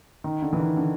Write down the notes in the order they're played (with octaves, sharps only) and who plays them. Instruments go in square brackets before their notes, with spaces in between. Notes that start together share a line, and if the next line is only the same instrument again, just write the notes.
[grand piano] D#3
D3
E3
D#3
D3